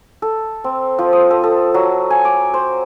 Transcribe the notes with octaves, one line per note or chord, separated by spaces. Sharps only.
A4
C4
F3
D#6
A4
A4
F#3
G#5
D6
C5